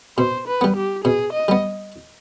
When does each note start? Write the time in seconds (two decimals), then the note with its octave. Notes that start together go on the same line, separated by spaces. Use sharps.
0.18 B2 C5
0.47 B4
0.61 G3 B3
0.76 G4
1.04 B2 G#4
1.33 D#5
1.48 G3 B3